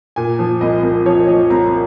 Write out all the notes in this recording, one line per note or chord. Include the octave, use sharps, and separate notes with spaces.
A#2 G#5
F3
C2 D#5
C2
F3 C#5
F3 D#5
C2 A#5